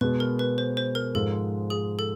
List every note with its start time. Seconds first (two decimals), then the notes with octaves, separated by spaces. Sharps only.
0.01 B2 G#3 B3 B4
0.20 A#4
0.39 B4
0.58 C5
0.77 C5
0.95 A#4
1.15 G#2 F3 G#3 A4
1.70 G#4
1.99 A4